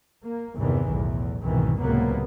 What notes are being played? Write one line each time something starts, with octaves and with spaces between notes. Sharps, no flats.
A#3
G1 E2 C3 D#3 E3
B1 E2 A2
C2 F2 G#2 B2 D#3 E3
C#2 A2 C3 F#3 A#3 B3